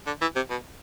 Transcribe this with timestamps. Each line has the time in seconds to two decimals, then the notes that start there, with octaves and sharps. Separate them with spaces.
0.06 D3
0.21 E3
0.36 C3
0.50 B2